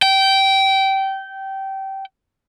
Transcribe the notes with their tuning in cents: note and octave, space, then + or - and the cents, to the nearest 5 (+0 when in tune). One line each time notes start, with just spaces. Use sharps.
G5 -20